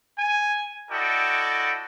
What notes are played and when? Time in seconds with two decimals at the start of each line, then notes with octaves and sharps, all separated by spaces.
0.18 G#5
0.90 E4 F#4 A4 D5 D#5 G5